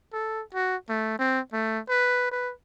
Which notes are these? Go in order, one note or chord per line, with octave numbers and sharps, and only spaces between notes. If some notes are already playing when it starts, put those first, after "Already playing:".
A4
F#4
A3
C4
A3
B4
B4